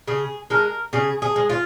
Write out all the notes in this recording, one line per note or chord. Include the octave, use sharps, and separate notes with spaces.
C#3 G#4
G#3 A#4
C#3 G#4
G#4
G#3
F4